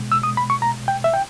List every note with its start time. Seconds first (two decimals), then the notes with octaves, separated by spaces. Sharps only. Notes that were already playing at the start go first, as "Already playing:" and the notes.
Already playing: B2 G#3
0.12 E6
0.23 D#6
0.37 B5
0.50 C#6
0.62 A#5
0.88 G5
1.04 E5
1.14 G5